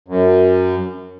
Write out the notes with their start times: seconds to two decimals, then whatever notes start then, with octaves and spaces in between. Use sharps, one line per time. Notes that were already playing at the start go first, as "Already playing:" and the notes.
0.08 F#2